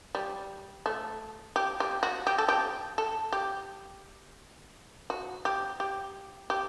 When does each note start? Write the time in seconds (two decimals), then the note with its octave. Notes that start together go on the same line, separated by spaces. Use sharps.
0.15 G3
0.86 A3
1.56 G4
1.80 G4
2.03 F#4
2.27 G4
2.38 A4
2.49 G4
2.98 A4
3.33 G4
5.10 F#4
5.45 G4
5.80 G4
6.50 G4